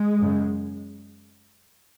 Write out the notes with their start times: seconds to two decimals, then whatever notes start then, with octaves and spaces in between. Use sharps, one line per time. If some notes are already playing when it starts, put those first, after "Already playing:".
Already playing: G#3
0.20 F#2 C#3